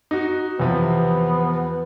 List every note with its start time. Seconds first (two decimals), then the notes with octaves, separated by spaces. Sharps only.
0.11 D#4 F#4
0.60 E2 C3 F3 B3